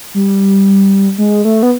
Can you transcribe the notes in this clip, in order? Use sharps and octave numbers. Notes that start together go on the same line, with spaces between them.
G3
G#3
A3
B3